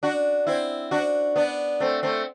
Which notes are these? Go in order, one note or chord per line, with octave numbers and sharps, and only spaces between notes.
D4 F#4
C4 E4
D4 F#4
B3 D4
A3 C4
A3 C4